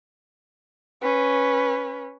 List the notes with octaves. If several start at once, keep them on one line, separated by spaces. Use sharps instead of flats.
C#4 B4